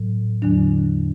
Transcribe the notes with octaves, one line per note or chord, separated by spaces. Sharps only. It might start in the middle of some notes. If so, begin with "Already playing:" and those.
Already playing: A2 F#3
E2 D3 F#3 D4